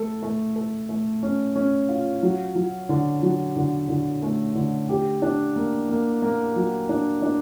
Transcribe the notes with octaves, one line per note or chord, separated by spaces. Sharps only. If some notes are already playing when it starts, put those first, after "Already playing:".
Already playing: A3 A4
A3
A4
A3
C#4
C#4
F4
F#3
F#3
D3
F#3
D3
D3
A3
D3
G4
D4
A#3
A#3
A#3
F#3
D4
D4